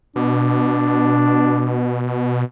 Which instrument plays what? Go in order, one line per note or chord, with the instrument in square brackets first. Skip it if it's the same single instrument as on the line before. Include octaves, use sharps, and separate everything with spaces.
[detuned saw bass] B2 [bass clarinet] D4